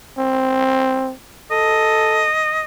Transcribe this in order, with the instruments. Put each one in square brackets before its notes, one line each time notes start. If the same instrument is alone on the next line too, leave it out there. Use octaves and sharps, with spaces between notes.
[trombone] C4
[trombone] A4 [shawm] D#5